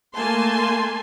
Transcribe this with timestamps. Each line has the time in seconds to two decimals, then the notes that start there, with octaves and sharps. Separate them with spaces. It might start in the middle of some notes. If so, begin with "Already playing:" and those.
0.15 A3 A#3 G#5 A5 C6